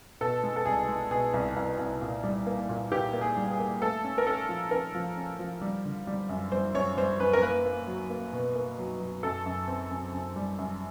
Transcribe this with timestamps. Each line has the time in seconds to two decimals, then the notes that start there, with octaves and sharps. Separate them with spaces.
0.21 B2 A4
0.43 G#3
0.56 A4
0.66 C2 G#4
0.88 G#3
1.11 B2 G#4
1.34 C2
1.56 C2
1.78 C2
2.01 A#2
2.24 G3
2.46 A#3
2.69 A#2
2.92 A#2 G4
3.13 A#3
3.21 G#4
3.37 G3
3.51 G#4
3.59 A#3
3.82 A3 A4
4.04 C#4
4.18 A#4
4.27 C#4 A4
4.49 F3
4.71 C#4 A#4
4.95 F3
5.17 C#4
5.39 F3
5.61 G3
5.85 D3
6.07 G3
6.29 F#2
6.52 G3 C5
6.74 F#2 C#5
6.97 G3 C5
7.19 F#2 B4
7.33 A#4
7.42 A#3 B4
7.65 A#3
7.87 F#3
8.10 A#3
8.33 B2
8.55 A#3
8.78 F#3
9.00 F#3
9.23 F#2 A4
9.46 F#2
9.68 C4
9.90 F#2
10.13 F#2
10.36 G3
10.58 F#2